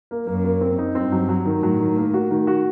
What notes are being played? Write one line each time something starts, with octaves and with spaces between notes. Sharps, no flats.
A#3
F#2 A#3
A#3
C4
D#4
G2 C4
F#3
F#3
D#3
A2 F#3
D#3
A#3
F#4
D#3
F#4